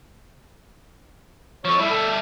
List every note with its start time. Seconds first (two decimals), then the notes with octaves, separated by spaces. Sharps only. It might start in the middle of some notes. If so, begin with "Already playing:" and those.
1.65 F3 A4 C#5
1.78 G3 A3 E4
1.90 A4